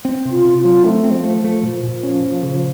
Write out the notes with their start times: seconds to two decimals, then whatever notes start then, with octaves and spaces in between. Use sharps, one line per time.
0.05 C4
0.25 C3
0.31 F4
0.45 C3
0.58 F4
0.64 F#3
0.84 A3 C4
1.04 C4
1.11 F3
1.23 A3
1.37 F3
1.44 A3
1.63 A#2 F3
1.83 A#2
2.03 C#4
2.23 A#2
2.43 C#3